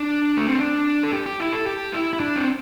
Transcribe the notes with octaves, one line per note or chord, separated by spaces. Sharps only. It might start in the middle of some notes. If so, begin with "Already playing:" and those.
Already playing: D4
A3
C4
D4
A4
G4
G4
E4
A4
G4
E4
E4
D4
C4